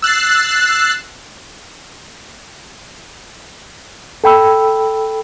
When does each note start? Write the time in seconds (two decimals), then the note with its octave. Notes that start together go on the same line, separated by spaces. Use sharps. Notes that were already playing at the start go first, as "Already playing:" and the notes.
0.02 E6 F#6 A6 C7
4.24 A4 G5 B5 E6